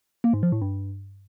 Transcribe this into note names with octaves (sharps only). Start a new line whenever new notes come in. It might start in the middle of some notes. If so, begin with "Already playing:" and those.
A#3
G#2
F3
A2
G2